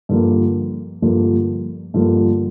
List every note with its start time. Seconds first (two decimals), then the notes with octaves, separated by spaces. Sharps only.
0.09 G2 D3 F3 A#3
1.02 G2 D3 F3 A#3
1.94 G2 D3 F3 A#3